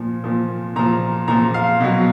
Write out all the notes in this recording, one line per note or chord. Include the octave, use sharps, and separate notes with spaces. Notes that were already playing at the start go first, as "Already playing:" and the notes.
Already playing: A#2 F3
A#2 F3
A#2 F3 A#5
A#2 F3 A#5
F5
B2 F#3